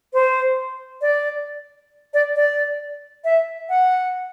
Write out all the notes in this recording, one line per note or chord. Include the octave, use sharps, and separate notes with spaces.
C5
D5
D5
D5
E5
F#5